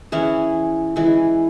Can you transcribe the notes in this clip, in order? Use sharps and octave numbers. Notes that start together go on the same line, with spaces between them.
E3 C#4 E4 G#4
E3 G#3 E4